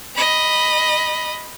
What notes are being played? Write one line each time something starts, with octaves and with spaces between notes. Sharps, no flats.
D#5 B5